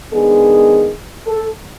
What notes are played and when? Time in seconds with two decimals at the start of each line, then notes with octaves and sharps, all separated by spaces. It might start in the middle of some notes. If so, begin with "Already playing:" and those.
0.11 D#3 G#3 B3 D4 G#4
1.27 A4